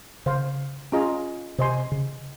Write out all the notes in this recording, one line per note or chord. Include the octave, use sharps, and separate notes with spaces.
C#3 C5 F5 C6
C#4 F4 G#4 D#5 A#5
C3 C5 D#5 G#5 C6
C#3